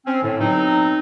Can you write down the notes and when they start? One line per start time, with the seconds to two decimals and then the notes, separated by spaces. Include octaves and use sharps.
0.06 C4 C#4
0.22 A2 D3
0.40 B2 F#3 C4 D#4